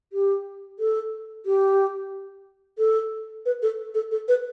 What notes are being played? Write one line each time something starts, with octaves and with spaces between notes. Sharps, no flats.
G4
A4
G4
A4
B4
A4
A4
A4
B4